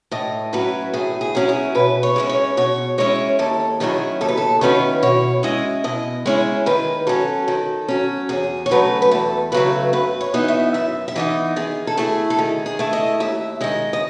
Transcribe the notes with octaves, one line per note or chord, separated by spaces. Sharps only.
A2 D#5
F#3 C#4 E4 B4
A2 G#4
G#4
F#3 C#4 E4
G#4
B2 B4
C#5
G#3 C#4 E4
C#5
B2 C#5
G#3 C#4 E4 C#5
D#2 A4
D#3 F#3 C#4 E4 G#4
D#2 A4
B4
A4
D#3 F#3 C#4 E4 B4
B2 C#5
G#3 C#4 E4 D#5
B2 D#5
G#3 C#4 E4 C#5
D#3 B4
F#3 C#4 A4
D#3
F#3 C#4
E2 G#4
C#5
C#3 F#3 A3 B4
B4
E2 A4
C#3 F#3 A3 B4
F#2 B4
C#5
E3 B3 D#4
E5
F#2 E5
E5
E3 B3 D#4 D#5
D#3 G#4
A4
A3 E4 G#4
A4
D#3 G#4
G#4
A3 E4
D#5
D#2 E5
D#3 G#3 D#5
D#5